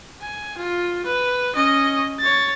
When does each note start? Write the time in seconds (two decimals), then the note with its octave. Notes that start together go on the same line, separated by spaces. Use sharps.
0.22 G#5
0.58 F4
1.06 B4
1.55 C#4 D#5
2.19 C#5 A6